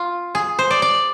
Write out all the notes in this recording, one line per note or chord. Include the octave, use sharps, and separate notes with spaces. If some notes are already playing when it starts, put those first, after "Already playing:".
Already playing: F4
G#4
C5
D5
D5